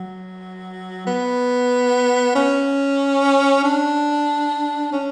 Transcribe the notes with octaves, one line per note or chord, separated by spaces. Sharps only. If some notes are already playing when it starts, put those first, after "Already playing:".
Already playing: F#3
B3
C#4
D4
C#4